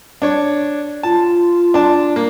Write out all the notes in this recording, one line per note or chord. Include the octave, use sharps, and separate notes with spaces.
D4 C#5
F4 A5
D4 A5
A#3